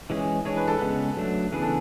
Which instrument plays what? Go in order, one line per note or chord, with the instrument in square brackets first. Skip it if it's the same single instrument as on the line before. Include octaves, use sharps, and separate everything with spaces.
[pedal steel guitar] E3 G#3 C#4 G#4
[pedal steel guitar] E3 G#3 D4 G#4 [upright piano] C#5
[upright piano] B4
A4
[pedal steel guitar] C#3 G#3 B3 [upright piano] B4
[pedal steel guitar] F#3 A3 D4
[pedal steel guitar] C#3 E3 B3 D4 G#4 [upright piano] B4
[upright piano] A4